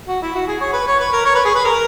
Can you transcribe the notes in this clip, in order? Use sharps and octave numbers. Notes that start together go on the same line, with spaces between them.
F#4
E4
F#4
G#4
C#5
B4
C#5
B4
A#4
C#5
B4
G#4
B4
A#4